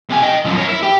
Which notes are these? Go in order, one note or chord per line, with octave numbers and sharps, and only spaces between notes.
C3 G#5
D#5 G5
F#2 F3
A#4 C#5
E4
G4